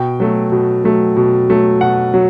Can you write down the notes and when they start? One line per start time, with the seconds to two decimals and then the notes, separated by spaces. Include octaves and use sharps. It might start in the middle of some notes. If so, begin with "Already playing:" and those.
Already playing: B2 G5
0.20 F#3 A3
0.52 B2
0.84 F#3 A3
1.17 B2
1.49 F#3 A3
1.81 B2 F#5
2.14 F#3